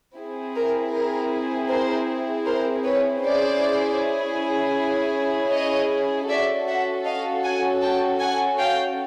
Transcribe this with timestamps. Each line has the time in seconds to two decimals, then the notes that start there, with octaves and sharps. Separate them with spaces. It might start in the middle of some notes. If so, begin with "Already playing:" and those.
0.16 C4 E4 G#4
0.55 A#4
0.93 A#4
1.69 A#4 C5
2.46 A#4 C5
2.84 B4 C#5
3.23 C#4 E4 G#4 C5 D5
5.52 C#5 D#5
6.29 C#4 F#4 A4 D5 E5
6.67 E5 F#5
7.05 D#5 F5
7.44 F#5 G#5
7.82 G5 A5
8.20 F#5 G#5
8.59 F5 G5